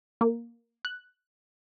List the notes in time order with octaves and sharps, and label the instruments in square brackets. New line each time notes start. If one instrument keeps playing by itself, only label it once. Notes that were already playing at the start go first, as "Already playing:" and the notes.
[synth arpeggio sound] A#3
F#6